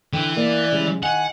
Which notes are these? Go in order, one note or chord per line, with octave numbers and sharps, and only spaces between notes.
D3 E3 G5
A#3 D5
C#3 G3 G#3
D#3 F#5 G#5